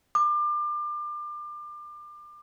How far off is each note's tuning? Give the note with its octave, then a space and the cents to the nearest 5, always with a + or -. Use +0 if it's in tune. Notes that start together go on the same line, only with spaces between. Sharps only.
D6 +30